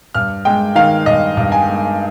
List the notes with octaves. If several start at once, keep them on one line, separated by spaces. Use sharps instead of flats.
G2 F6
G#3 G5
D#3 F5
G2 D#5
G2
G#5
G#3